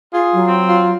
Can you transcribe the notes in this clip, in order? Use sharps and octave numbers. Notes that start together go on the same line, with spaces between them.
F4 G#4
F#3
C4
F4